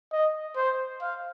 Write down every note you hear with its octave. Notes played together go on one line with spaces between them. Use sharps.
D#5
C5
F5